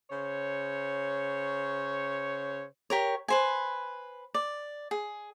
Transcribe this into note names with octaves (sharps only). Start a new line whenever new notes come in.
C#3 C5 C#5
G4 A#4 C#5
B4 C5 G#5
D5
G#4